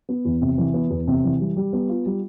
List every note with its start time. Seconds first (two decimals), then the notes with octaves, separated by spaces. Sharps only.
0.09 B3
0.25 E2
0.41 C3
0.58 E3
0.74 B3
0.90 E2
1.07 C3
1.24 E3
1.40 G3
1.57 G3
1.73 B3
1.89 F4
2.06 G3